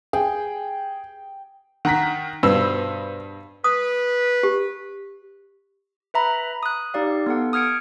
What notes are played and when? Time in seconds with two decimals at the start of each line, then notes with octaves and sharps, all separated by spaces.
0.13 G#4 G5
1.85 D#3 F#5 A#5 B6
2.43 G2 B2 C5 E6
3.64 B4 D#6
4.43 G4
6.14 B4 E5 A#5 B5
6.63 D#6 F#6
6.94 D#4 G4 D5 F5
7.26 B3 A4 F#5
7.53 D#6 F6 G#6 C#7 D7